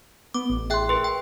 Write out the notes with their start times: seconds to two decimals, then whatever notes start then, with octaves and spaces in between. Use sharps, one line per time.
0.34 B3 D6
0.50 A1
0.70 G#4 E5 G5 C6 F#6
0.89 G#4 A#4 B4 C6
1.04 G5